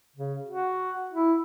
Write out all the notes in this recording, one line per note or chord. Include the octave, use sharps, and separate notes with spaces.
C#3
F#4
E4